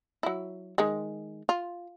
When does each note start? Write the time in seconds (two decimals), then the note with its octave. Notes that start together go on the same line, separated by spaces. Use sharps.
0.23 F#3 E4
0.78 D#3 G#3
1.49 F4